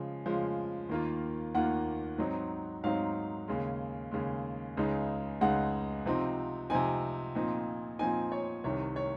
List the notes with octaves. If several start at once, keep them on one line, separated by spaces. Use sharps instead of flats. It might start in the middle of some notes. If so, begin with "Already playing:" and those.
Already playing: C#3 F3 G#3
C#3 F3 G#3
D#2 D#3 A#3 F4
D#2 D#3 A#3 F4 F#5
G#2 F#3 C4 D#4
G#2 F#3 C4 D#4 F5
D#2 C#3 G#3
D#2 C#3 G#3
C#2 C#3 G#3 D#4
C#2 C#3 G#3 D#4 F#5
C3 F3 C4 D#4
C3 F3 C4 D#4 G#5
A#2 F3 C4 D#4
A#2 F3 C4 D#4 G#5
C#5
C2 C3 D#3 C#5
C#5